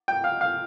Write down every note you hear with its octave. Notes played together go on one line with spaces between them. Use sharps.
G5
F5
F5